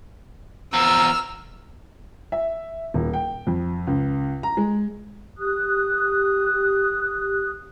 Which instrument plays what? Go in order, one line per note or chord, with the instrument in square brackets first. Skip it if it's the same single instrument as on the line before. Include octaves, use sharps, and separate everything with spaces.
[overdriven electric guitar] E2 F3 [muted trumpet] A#5 [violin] E6 F6
[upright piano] E5
D#1
G5
F2
C#2
A#5
G#3
[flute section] G4 D#6 F#6